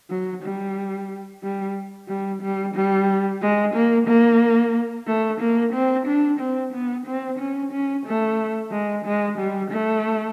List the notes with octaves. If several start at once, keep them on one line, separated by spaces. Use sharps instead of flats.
F#3
G3
G3
G3
G3
G3
G#3
A#3
A#3
A3
A#3
C4
D4
C4
B3
C4
C#4
C#4
A3
G#3
G#3
G3
A3